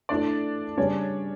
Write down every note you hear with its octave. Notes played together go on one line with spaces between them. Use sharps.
A3 D4 E4 A4 D5
C#3 G3 C#4 D4 G4 C#5